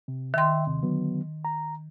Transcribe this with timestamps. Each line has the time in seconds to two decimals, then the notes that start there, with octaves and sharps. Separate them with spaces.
0.08 C3
0.34 D#3 E5 G5 C6
0.67 D#2 C3
0.83 D3 F#3 B3
1.45 A#5